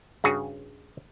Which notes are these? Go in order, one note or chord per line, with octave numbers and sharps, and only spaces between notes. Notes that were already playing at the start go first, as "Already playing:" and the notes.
G2 C#3 F#4 G#4